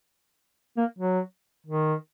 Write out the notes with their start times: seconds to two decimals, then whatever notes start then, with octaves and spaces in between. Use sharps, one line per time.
0.77 A#3
0.99 F#3
1.67 D#3